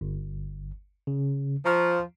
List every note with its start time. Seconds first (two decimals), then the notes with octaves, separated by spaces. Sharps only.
0.01 G1
1.07 C#3
1.66 F3 A#5 C#6 F6